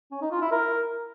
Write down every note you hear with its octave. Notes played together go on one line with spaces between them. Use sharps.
C#4
D#4
F4
E4
A#4